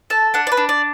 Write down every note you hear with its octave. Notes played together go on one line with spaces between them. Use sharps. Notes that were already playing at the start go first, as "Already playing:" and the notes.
A4 A5
D4 F#5
D5
B4
D4
D5